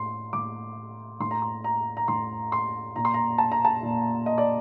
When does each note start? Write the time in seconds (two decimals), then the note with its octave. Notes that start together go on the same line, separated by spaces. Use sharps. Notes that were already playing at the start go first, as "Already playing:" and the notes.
Already playing: A2 C6
0.33 A2 D6
1.20 A2 C6
1.31 A#5
1.42 C6
1.64 A#5
1.97 A#5
2.08 A2 C6
2.52 C6
2.96 A#2 A#5
3.05 C6
3.14 A#5
3.38 A5
3.52 A#5
3.65 A5
3.83 A#2
4.26 D#5
4.38 D5